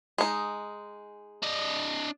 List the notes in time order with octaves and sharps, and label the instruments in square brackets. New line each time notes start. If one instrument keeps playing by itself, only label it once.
[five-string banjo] G#3 D#4
[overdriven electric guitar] D4 D#5